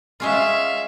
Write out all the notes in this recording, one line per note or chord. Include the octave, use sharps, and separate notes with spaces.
G#3 C#4 F4 E5 F5